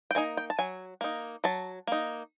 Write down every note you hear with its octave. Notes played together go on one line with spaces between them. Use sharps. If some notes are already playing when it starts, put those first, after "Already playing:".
G5
A#3 D#4 G#5
G5
A5
F#3 G#5
A#3 D#4
F#3 A5
A#3 D#4